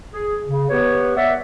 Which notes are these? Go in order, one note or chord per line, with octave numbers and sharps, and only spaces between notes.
G#4
C#3
B3 G4 B4 C#5
D5 E5 F#5